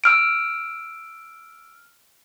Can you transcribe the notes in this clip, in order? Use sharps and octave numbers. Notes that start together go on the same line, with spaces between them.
E6 F6 D7